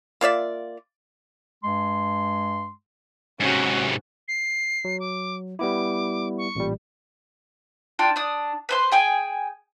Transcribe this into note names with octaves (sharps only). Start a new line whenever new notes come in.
A#3 F4 D5 E5
G2 G#3 C6
G#2 C3 C#4 F#4
C7
F#3
D6
G3 B3 E4 D6
C#6
A1 A#2 G3
D4 F4 G5
D4 D#6
B4 C5 C6
G#4 G5 G#5